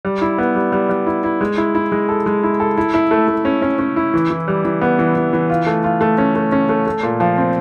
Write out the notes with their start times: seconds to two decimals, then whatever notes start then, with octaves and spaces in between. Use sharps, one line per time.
0.05 G3
0.21 E4
0.38 B3
0.55 G3
0.72 G3
0.89 G3
1.07 E4
1.24 E4
1.41 G#3
1.57 E4
1.75 E4
1.92 G#3
2.09 A4
2.26 G#3
2.43 E4
2.60 A4
2.78 E4
2.94 E4
3.11 A3
3.28 A3
3.45 C#4
3.62 C#4
3.79 C#4
3.96 E4
4.14 E3
4.30 E3
4.48 G3
4.65 E3
4.81 B3
4.99 E3
5.16 E3
5.33 E3
5.50 F4
5.67 A3
5.84 F4
6.01 A3
6.18 C#4
6.35 A3
6.52 C#4
6.69 A3
6.87 A3
7.03 A#2
7.20 F3
7.38 C4